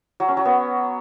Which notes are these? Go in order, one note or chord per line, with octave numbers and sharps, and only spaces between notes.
F#3
C#4
F#3
B3